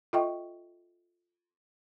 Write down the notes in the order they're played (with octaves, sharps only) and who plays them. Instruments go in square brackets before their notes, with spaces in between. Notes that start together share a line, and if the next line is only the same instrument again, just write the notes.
[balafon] F4 A4 D#5 E5 G5 C#6